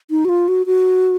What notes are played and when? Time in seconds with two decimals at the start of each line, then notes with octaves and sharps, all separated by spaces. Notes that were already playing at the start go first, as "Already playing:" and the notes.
0.11 D#4
0.25 F#4
0.29 F4
0.48 F#4
0.66 F#4